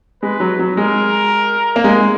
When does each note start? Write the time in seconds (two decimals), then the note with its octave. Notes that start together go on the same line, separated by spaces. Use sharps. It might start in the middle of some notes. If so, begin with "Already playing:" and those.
0.23 G#3 B4
0.40 F#3
0.59 F#3
0.77 G#3 A#4
1.76 A#3
1.84 G#3